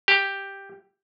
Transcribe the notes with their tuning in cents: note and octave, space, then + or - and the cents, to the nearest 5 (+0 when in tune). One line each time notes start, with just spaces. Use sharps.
G4 +5